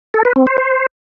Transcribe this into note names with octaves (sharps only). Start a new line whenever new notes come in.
A4
B4
C4
C5
C5